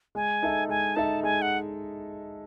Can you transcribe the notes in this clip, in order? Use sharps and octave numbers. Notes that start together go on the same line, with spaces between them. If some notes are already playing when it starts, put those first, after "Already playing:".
G#3 G#5
D#4 A4 E5
G#3 G#5
D#4 A4 E5 A5
G#3 G#5
F#5